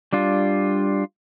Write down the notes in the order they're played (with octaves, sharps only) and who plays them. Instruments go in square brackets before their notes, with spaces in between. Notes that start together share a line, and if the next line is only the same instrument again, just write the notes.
[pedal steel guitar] G3 D4 F4